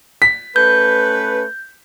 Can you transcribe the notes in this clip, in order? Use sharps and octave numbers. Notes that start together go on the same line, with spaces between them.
B6
A3 C#4 B4 G6